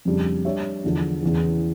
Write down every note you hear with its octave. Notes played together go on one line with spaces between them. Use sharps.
F2 C#3 G3 D4
G3 D4 G4 C#5 E5
E2 D3 F3
E2 C#3 E3